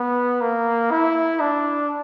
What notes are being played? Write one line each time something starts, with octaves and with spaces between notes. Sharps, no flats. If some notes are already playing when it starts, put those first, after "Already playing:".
Already playing: B3
A#3
E4
D4